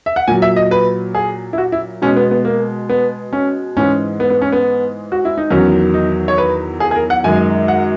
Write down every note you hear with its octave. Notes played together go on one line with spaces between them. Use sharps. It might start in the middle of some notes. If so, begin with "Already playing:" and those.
E5
F#5
A#2 F#3 G#5
E5
D#5
B4
G#4
E4
F#4
E4
B2 G#3 C#4
B3
B3
A#3
B3
C#4
G#2 E3 G#3 C#4
B3
B3
C#4
B3
F#4
E4
D#4
E2 D#3 F#3 C#4
D#4
C#5
B4
G#4
G#4
A#4
F#5
F#2 D#3 G#3 G#5
F#5